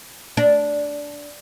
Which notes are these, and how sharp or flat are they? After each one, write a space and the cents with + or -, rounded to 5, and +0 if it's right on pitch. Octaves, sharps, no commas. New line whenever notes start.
D4 -10